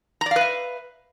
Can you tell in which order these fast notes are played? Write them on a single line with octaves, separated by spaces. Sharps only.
A#5 D5 F5 B4 E5